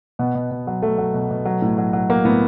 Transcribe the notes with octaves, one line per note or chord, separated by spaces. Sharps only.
B2 B3
B2
B2
F#3
F#3 A3
F#3
B2
B2
F#3
A2
F#3
F#3
F#3 A#3
A2 B3